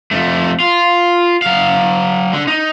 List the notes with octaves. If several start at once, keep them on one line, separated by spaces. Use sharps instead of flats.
F2 A3
F4
F#3 F5
D3
D#4